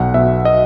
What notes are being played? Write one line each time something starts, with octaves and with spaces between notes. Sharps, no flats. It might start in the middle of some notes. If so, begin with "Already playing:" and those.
Already playing: B1 F#5
B2 E5
D#5